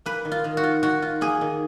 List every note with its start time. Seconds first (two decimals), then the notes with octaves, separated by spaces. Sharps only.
0.06 A#3 B4
0.25 D#3
0.32 F4
0.44 D#3
0.57 F#4
0.64 F4
0.83 D#3 F#4
1.02 F4
1.21 A#3 G#4
1.41 D#3